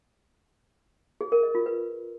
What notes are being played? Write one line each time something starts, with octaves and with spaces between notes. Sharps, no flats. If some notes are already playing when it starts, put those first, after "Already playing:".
G#4
A#4
D#5
F4
B4